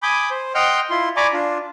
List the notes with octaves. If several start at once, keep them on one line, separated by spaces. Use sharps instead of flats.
G#5 B5 D6 D#6 G6
C5
D#5 F#5 G5 C6 F6 G6
E4 F4 C6
D5 G#5 A#5 B5 C#6 D6
D4 F4